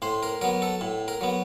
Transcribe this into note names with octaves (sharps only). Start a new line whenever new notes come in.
A2 C5
A#4
F#3 B3 A#4
A4
A2
A#4
F#3 B3